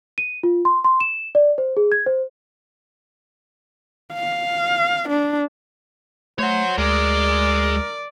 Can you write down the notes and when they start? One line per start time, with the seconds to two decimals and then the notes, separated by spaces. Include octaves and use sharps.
0.18 D#7
0.43 F4
0.65 C6
0.84 C6
1.00 E7
1.35 D5
1.58 C5
1.77 G#4
1.92 G#6
2.06 C5
4.13 F5
5.09 D4
6.39 A3 C5 C#5 F#5
6.78 D2 G#3 G#4 A#4 D5